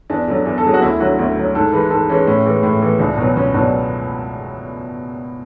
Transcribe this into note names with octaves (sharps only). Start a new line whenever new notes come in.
E2 D4
D3 F#3
E2
A4
D3 F#3 G#4
F#4
D2 E4
D3 F#3 F#4
D2
D3 F#3
G#2 A4
E3 G#3 B4
G#2 A4
E3 G#3 C#4
A2 C#4
E3 G#3
A2
E3 G#3
C#2 D4
B2 F#3
C#2 C#4
B2 F#3 D4